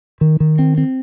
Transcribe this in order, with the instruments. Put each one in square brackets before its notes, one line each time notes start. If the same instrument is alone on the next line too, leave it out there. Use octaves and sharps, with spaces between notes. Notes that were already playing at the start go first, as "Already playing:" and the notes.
[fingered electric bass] D#3
D#3
C4
C4